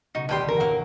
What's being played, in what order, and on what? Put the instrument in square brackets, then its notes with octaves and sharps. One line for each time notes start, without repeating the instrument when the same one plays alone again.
[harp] B1 C#3 C#7 [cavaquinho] D#4 F#4
[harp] D2 D#3 [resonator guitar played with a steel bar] A2 G3 G4 [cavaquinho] B4 G5 C6
[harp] E3 G#5 [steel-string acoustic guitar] A#4 [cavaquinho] A#5
[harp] G#2 C#5 [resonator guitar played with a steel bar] F#3 A#3